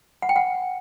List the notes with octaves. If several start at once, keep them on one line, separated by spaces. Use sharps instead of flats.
F#5
G5
F#5